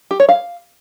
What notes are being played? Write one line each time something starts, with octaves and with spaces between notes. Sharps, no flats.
G4
C#5
F5